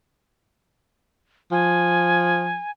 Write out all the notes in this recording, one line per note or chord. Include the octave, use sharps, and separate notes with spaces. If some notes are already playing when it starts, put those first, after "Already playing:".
F3 G#5